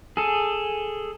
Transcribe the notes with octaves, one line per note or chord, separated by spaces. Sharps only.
G#4 A4